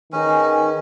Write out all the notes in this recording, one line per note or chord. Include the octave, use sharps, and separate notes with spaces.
D#3 C#4 D#4 G#4 B4